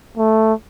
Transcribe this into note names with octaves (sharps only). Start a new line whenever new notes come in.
A3